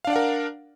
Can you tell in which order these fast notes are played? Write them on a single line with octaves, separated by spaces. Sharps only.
F5 D4 D5 F#5 A#4